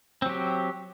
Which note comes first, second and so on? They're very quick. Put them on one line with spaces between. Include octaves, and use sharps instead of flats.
C4 F#3 G4